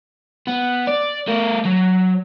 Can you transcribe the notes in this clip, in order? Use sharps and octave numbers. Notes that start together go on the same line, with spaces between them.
B3
D5
A3 A#4
F#3